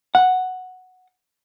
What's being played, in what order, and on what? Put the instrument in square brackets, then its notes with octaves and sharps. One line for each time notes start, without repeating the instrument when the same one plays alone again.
[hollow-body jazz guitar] F#5